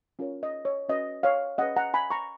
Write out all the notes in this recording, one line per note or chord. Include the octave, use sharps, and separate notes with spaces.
C#4 F4 A#4 C#5
D#5
C#5
C#4 F#4 B4 D#5
C#5 F5
C#4 G#4 B4 D#5 F#5
F#5 A#5
G#5 B5
A#5 C#6